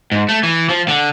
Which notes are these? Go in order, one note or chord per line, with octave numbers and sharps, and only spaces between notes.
G#2
A3
E3
F3
D3